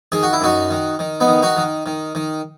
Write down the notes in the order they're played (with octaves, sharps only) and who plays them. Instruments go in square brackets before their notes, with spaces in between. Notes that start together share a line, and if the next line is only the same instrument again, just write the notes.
[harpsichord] D#3 G#4
F#4
E4
F#2 D#4 F#4
D#3
D#3
B3 D#4
D#3
D#4 F#4
D#3
D#3
D#3